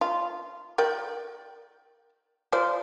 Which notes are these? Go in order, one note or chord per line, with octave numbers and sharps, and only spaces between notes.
F4
A#4 D5 G5
F4 C5 D5